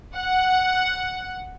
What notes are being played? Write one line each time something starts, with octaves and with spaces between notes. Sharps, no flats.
F#5